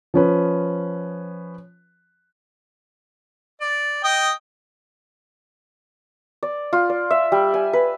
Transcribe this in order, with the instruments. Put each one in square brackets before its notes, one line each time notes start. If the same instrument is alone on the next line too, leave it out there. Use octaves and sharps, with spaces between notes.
[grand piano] F3 C#4 B4
[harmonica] D5
D#5 G5 D#6
[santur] D5
F4
D5
E5
G3
G#5
B4